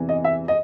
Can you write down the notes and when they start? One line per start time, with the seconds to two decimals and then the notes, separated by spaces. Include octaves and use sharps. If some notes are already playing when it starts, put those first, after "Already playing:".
Already playing: E2 C3 E3
0.09 D#5
0.24 E5
0.48 D#5